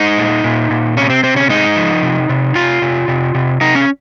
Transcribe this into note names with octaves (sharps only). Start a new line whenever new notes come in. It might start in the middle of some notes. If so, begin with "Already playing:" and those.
Already playing: G#3 D#4
A#2
A#2
A#2
C3 C#4
C4
C3 C4
C#4
G#3 D#4
F3
C3
C3
C3 F4
C3
C3
C3
C3 D#4
C#4